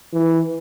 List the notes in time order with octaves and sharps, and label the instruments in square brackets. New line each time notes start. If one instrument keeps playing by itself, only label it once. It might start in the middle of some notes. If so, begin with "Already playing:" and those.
[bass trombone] E3